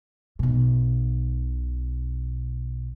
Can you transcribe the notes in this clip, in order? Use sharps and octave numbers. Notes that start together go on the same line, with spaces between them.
B1 B2